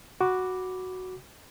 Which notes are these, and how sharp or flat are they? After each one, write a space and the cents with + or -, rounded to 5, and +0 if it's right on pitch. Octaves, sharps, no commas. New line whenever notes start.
F#4 +0 B5 +0 D6 +0